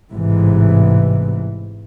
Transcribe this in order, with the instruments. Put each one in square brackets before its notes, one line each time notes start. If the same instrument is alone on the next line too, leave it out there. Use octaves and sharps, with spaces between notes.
[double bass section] A1 G#2 C3 E3